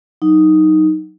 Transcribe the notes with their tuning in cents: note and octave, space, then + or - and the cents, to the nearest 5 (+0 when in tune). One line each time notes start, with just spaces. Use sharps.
F#3 +0 D#4 +0